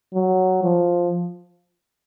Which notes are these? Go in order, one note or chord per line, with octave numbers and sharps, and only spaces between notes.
F#3
F3